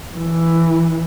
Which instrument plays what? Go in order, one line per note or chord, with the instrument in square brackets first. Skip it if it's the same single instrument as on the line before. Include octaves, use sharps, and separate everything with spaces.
[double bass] E3